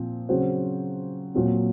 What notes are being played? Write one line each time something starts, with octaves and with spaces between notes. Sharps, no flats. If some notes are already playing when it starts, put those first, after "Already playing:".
Already playing: A#2 F3 C4
C#3 F#3 C4 F#4 C5
A#2 F#3 C4